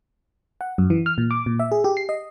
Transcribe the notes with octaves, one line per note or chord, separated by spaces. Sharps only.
F#5
F#2
E3
F6
A#2
D6
A#2
E5
G#4
G4
C7
D#5